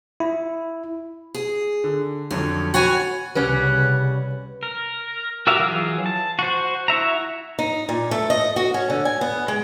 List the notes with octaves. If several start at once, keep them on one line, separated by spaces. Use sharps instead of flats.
E4
G#4
D3
F2 D3 F#3 C#4
F#4 C#5 G5 G#5 B5 A6
C2 C#3 G3 C#4 B4 F#5
A#4
F#4 G4 A#4 E5 F5
E3 F#3 F4 G#4
A5
F#4 C5
E4 F#4 E5 A#5
D#4
A#2
A3
D#5
F#4
C#4
D3
G#5
B3
G#3